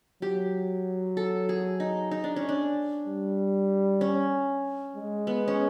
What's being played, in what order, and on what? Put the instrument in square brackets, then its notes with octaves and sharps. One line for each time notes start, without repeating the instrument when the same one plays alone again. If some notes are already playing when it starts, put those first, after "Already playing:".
[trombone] F#3 [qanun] G4
[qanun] A4
G#4
D#4
D#4
D4
C#4
D4
[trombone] G3
[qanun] C#4
[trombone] G#3
[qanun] B3
C#4